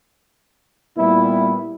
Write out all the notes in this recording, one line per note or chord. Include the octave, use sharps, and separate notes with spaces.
A#2 G3 B3 E4